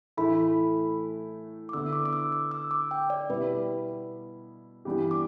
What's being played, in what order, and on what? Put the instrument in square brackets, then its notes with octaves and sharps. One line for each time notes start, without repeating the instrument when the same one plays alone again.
[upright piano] A2 E3 A3 E4 [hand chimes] B5
[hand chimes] D6
[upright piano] D3 B3 E4 [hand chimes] E6
[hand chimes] D6
D6
E6
D6
E6
D6
G5
D5
[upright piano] B2 G3 B3 E4 [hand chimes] B4
[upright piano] G2 E3 B3 G4
[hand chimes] D6